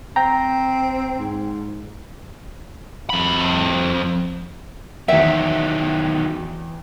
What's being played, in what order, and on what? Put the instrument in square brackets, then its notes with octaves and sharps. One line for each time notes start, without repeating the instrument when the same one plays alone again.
[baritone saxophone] C4 [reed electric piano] G5 A#5
[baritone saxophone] G#2
[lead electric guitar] F2 B5
[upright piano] E2 G5 [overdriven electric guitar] D#3 F#3 [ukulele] E5